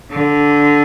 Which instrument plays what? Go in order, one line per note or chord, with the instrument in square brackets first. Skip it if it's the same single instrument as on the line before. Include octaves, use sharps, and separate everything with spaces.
[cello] D3